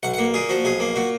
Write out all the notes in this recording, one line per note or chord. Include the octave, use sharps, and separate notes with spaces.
B1 F#5
A#3 F#5
A#2 G#4
F3 F#4
B1 G#4
A#3
A#2 F#4